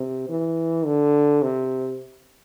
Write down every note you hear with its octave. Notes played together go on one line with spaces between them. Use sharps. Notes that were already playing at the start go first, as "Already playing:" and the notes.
Already playing: C3
E3
D3
C3